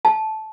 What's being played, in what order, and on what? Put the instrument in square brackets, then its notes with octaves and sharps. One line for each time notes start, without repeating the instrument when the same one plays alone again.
[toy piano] A5